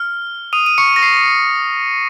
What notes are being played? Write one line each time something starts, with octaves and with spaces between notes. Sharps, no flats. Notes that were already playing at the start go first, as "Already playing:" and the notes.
Already playing: F6
D#6 D#7
D#7
C#6 C#7
A#6
C7